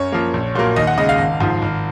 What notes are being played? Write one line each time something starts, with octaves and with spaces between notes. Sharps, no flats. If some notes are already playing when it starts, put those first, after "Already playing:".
Already playing: F#2 C#5
F3 A#3
A#1
A#2 F#3 A#3
D#2 D#5
F#5
C#3 G#3 D#5
F5
G#1
G#2 F3
G#1